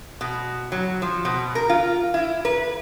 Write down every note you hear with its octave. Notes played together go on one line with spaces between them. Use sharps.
B2
F#3
F3
B2
A#4
F4
E4
B4